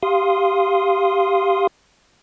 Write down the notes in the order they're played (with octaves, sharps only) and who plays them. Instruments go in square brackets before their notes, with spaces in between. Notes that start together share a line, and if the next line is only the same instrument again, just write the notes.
[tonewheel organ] G4 F5 C6 D#6